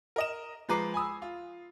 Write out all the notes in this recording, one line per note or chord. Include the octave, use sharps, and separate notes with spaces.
A#4 D#5 E7
F3 G#3 B4 A#5 D6 C7
G#5 B5 D#6 E6
F4